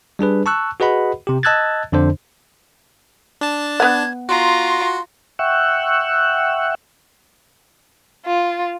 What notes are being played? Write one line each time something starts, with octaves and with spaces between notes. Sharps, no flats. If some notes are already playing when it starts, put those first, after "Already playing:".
G3 D4 G#4 B4
A5 C#6 E6 F#6
F#4 G#4 B4 D#5 F#5 B5
C3 G4
D#5 A5 E6 F#6 G#6 A6
F2 D3 D4 C5
D4 A5
B3 F#5 G#6
F4 F#4 A#5 C6
E5 F#5 G5 C#6 E6 F#6
F4